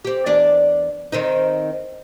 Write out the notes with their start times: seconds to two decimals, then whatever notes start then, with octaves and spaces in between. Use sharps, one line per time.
0.05 C4 G4
0.26 E2 D4 D5
1.12 D#3 C4 D#4